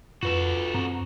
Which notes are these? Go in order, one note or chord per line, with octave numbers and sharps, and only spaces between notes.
F2 F4 F#4 A4 B4
F#2 C4 A#5